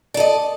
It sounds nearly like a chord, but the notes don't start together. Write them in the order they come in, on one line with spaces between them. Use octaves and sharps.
D5 A4 D#5